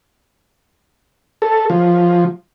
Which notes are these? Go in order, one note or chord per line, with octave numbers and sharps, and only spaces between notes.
A4
F3